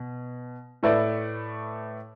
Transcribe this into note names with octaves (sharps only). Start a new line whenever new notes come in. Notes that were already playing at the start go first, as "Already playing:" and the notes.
Already playing: B2
A2 A3 E4 B4 D5